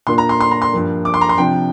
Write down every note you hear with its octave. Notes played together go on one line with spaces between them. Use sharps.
A#2 A#3 D4 F4 C6
A#5
C6
C6
A#5
C6
G2 F3 A#3
D6
C6
A#5
C6
C3 F3 D4 G5